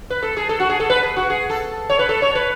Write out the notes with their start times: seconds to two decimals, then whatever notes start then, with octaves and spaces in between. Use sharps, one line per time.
0.10 B4
0.23 A4
0.37 G#4
0.49 A4
0.60 F#4
0.70 G#4
0.80 A4
0.90 B4
1.03 G#4
1.16 F#4
1.30 G#4
1.50 A4
1.90 C#5
1.99 B4
2.09 A4
2.22 C#5
2.35 B4